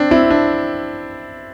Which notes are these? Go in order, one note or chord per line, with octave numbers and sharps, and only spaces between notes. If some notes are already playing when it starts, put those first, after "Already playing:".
Already playing: C4 D4
C4 E4
D4